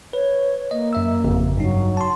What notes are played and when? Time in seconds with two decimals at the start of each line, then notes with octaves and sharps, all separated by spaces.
0.13 B4 C#5
0.71 A#3 D#5
0.93 F#2 E5 E6
1.24 G#1 F2 C#3
1.57 G2 F#3 D#4
1.97 A5 C6